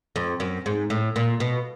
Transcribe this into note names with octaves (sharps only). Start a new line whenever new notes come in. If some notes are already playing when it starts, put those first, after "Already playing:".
F2
F#2
G#2
A2
A#2
B2